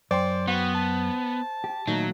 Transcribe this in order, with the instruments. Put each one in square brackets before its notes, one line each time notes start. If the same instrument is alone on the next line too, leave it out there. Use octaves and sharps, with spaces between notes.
[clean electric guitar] F#2 [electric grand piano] C5 G5 C6 [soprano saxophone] D5
[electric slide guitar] B3 [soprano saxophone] F#4
[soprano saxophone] A5
[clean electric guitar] G4
[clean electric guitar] A#2 D#3 A3 [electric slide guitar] F#3 [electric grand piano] D#4